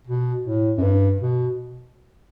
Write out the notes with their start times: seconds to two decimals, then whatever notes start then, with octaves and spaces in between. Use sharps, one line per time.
0.07 B2
0.45 A2
0.78 F#2
0.82 G2
1.20 B2